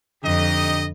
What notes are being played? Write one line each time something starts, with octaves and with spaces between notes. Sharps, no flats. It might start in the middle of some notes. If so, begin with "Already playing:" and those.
F2 D3 D#4 G4 D#5